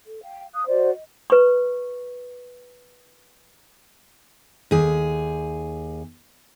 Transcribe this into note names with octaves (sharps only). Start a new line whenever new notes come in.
A4
F5 G5
F5 D#6 F#6
F#4 C5 D5 D#5
D#5
B4 C#6
D#2 G#4